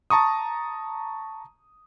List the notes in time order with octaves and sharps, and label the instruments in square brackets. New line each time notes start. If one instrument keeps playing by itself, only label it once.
[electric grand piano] A5 A#5 C#6 D#6